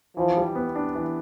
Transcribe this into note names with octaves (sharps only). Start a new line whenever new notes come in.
E3 F3
G3
B3
D4
E3